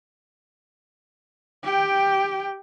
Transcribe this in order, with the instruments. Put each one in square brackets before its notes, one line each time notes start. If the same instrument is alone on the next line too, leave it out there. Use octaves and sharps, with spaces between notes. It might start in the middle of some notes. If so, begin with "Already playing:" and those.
[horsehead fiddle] G4 G5